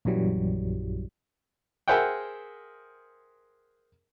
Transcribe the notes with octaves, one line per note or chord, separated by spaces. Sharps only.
A#1 F#2 E3 F#3 G3
G#4 A#4 C5 E5 F#5 G5